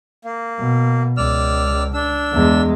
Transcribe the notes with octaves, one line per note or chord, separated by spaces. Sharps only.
A#3
B2
C#2 D5 E6 F6
D4 E6
E2 G#3